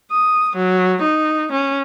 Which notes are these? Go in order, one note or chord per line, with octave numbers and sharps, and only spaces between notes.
D#6
F#3
D#4
C#4